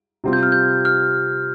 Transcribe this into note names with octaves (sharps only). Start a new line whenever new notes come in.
C3 G3 C4 F4
G6
F6
G6
F6